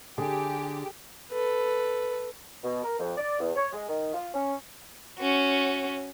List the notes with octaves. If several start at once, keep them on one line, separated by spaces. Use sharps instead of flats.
D3 G4 G#4
A4 B4
B2
A#4
F2
D5
E2
C#5
G#3
D#3
F4
C#4
C#4 F#4